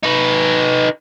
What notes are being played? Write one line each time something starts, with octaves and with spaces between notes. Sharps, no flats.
D#4 B4